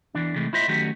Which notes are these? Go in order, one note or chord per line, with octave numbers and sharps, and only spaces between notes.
E2 E3 D4
C3 E3 G#3 A3
E4 F4 C5 D#5 E5
D#3 F#3 A3 C#4 F#4 G4